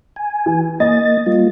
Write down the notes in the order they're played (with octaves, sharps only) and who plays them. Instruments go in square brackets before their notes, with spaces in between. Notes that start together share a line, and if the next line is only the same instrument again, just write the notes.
[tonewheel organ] G#5
[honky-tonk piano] E3
[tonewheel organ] A#3 A6 [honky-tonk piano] D#5
[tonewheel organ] G3 A#3 F4